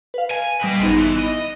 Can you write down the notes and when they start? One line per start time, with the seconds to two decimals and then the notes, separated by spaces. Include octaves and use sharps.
0.14 B4 F5
0.31 G#5
0.62 G3 B4 D#5 A#6 D7
0.80 G#1 F#2 G#3 B3 D#4
0.98 E3
1.19 D#5